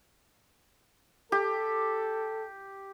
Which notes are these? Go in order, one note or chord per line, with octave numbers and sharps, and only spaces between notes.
G4 A4